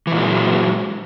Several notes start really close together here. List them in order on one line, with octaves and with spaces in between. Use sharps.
E3 A#2 G#3 F#3